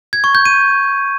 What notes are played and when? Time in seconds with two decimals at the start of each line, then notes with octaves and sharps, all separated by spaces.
0.13 G#6
0.24 C#6
0.35 G6
0.45 D#7